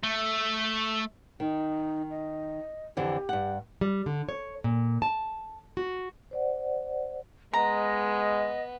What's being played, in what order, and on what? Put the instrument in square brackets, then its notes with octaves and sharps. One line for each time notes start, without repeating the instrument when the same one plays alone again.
[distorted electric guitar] A3
[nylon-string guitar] D#3 [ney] D#4
[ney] D#5
[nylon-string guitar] F2 D3 E3 [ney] G4
[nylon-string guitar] G2 F#5
G3
D3
C#5
A#2
A5
F#4
[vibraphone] C5 D5 F#5
[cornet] G#3 [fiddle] B3 [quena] D#5 [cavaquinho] A#5